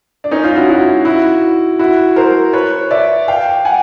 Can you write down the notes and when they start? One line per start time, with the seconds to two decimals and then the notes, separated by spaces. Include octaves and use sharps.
0.24 D4
0.31 C#4 D#4
0.44 D#4 F4
0.56 E4 F#4
0.69 E4 F#4
1.05 E4 F#4
1.79 E4 F#4
2.16 A#4 C5
2.53 B4 C#5
2.91 D5 E5
3.28 F5 G5
3.65 F#5 G#5